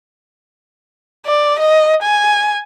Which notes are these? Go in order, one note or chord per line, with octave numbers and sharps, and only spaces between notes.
D5
D#5
G#5